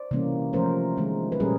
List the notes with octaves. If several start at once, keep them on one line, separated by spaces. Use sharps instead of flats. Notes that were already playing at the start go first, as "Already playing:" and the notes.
Already playing: C5 D5
C3 E3 G3 A#3 C#4
F3 A3 C#4 A#4 C5
D#3 G#3 C4
B4
A#2 G3 A#3 C#4 G#4 A#4